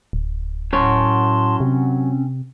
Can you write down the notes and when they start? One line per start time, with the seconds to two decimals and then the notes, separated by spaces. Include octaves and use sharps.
0.13 D1
0.73 F#2 A2 C#5 A5 C6
1.60 C3 C4 C#4